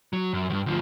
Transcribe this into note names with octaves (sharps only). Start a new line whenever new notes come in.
F#3
F#2
E2 G2
D2 F3